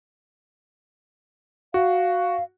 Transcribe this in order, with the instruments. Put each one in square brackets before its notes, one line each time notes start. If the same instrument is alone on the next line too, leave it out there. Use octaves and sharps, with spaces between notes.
[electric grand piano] F#4 [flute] F5